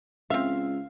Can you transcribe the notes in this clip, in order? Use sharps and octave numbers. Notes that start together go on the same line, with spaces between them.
C#2 C4 E5 F5